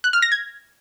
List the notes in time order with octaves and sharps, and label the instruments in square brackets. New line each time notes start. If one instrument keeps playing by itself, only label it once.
[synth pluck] F#6
F6
A#6
G#6